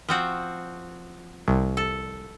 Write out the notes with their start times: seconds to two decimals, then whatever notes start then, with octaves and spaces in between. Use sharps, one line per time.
0.08 F3 C4 F#4
1.48 C2
1.77 A4